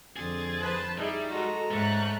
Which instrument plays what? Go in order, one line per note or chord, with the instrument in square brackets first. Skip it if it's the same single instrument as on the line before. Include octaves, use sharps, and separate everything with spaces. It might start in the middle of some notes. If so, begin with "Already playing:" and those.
[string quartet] F2 D3 [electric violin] C4 A6 [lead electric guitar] G#4
[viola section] B4 C5 A5
[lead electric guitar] G3 [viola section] D#4 E4 G#4
[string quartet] G#3 [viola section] F#4 A4 [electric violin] A#5
[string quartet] G#2 F#6 [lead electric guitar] A3 [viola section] C#4